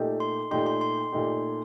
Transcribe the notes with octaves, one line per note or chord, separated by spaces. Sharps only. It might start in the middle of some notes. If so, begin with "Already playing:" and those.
Already playing: A#2 A3 D#4 G4
C6
A#2 A3 D#4 G4 C6
C6
C6
A#2 A3 D#4 G4